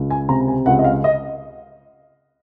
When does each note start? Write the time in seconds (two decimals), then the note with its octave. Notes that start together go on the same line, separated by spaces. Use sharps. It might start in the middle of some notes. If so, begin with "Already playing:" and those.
Already playing: C#2
0.10 G#5
0.29 C3 A#5
0.48 G#5
0.66 C#2 F#5
0.79 D#5
0.84 F5
1.04 D#5